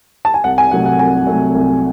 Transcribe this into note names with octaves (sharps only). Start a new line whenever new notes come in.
A5
G#5
C2 F#5
G#5
C3 F#3 A3 F#5
F#5
C2 G#5
C3 F#3 A3
C2